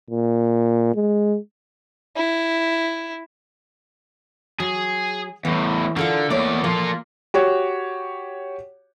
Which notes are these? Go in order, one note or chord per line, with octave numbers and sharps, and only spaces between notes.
A#2
G#3
E4
F#3 G#4
E2 A2 E3
D3 F4 A4 A#4
E2 A3 A#3 C#5 D5
F3 A#3 F4 A4
F#4 G4 C#5